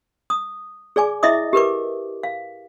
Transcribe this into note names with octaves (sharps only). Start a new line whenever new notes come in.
D#6
G#4 D5 G#5 D6
E4 D#5 E5 D6 D#6
G4 A#4 B4 D6
F5